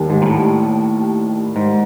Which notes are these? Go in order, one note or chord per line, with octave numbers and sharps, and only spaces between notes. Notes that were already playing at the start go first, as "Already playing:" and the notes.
Already playing: D#2 D#3 G3
G#2
A#2
A2
G#2